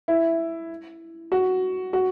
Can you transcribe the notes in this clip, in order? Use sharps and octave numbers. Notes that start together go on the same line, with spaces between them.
E4
F#4
F#4